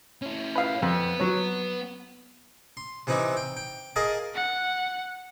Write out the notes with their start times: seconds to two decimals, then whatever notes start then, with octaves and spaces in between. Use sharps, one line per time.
0.22 C#4 E4
0.55 B4 F5
0.82 F2 B3
1.20 F#3 C#5
2.77 C6
3.07 C3 E3 C4 D#4 E4
3.37 G5
3.57 G5
3.96 G#4 A#4 D#5 F5 A5
4.35 F#5